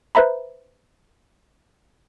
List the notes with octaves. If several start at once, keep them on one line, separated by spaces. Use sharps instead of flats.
B4 C5 E5 A#5 B5